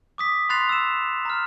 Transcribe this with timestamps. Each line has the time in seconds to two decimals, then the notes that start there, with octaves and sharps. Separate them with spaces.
0.18 D6 D#6 B6
0.49 B5 C6 F#6 A6 C7 F7
0.69 E6 E7
1.25 A#5 F6